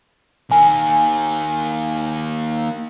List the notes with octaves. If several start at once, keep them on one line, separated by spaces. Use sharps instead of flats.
D#3 A#3 G#5